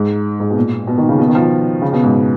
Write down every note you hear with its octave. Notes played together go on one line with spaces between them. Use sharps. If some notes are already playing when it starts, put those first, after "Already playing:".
Already playing: G#2
G#2
B2
A#2
B2
D#3
C#3
B2
D#3
F3
C#3
B2
G#2